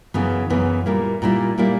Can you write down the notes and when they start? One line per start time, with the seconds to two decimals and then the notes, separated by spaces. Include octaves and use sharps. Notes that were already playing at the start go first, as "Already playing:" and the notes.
0.14 F#2 C#3 E3 B3
0.50 F#2 C#3 E3 B3
0.86 A#2 G3 A#3 E4
1.22 A#2 G3 A#3 E4
1.58 A#2 G3 A#3 E4